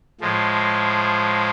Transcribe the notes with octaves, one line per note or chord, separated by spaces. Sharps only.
A2 F3 G#3